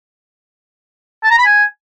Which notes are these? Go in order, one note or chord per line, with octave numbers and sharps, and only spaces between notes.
A5
A#5
B5
G#5